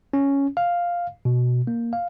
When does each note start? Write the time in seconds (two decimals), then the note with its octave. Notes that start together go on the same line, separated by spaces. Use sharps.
0.13 C#4
0.57 F5
1.25 B2
1.67 A#3
1.93 F5